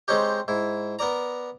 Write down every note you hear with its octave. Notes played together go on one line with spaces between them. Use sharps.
G#3 C4 C#4 D#4 G4
G#2 E4
B3 A#4 D5 A#5